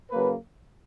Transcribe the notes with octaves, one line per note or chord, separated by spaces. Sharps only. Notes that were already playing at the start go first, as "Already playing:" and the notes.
C#3 F#3 A#3 B4